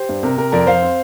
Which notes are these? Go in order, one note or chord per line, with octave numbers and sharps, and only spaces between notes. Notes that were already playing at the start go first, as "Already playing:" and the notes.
Already playing: G4 C5
G2
C3 A#4
C3 A#4
F2 A#4 D5
F2 C5 F5
C4